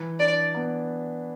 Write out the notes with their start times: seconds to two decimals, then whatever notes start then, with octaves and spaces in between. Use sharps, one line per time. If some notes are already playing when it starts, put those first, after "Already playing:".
Already playing: E3
0.19 D4 D5
0.55 B3